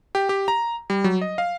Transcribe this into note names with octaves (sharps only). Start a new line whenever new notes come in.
G4
G4
A#5
G3
F#3
D#5
F5